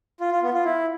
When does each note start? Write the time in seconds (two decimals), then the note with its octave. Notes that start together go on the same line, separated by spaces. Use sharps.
0.20 F4
0.31 F4
0.43 B3
0.54 F4
0.65 E4